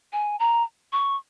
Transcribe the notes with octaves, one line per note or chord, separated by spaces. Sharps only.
G#5
A#5
C#6